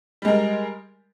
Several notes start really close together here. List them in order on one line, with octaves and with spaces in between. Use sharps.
G3 G#3 A#4